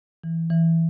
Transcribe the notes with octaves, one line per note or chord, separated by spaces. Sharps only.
E3
E3